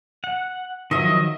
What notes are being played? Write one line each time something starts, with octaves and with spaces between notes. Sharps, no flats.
F#5
D#3 F3 F#3 D#5 E5